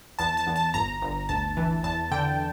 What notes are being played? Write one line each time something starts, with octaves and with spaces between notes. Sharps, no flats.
E2 A5
A5
E2
A5
G1 A#5
G1
D2 A5
E3
E2 A5
D3 G5